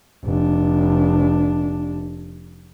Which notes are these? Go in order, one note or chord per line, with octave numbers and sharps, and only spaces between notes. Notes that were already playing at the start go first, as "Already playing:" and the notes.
F1 D4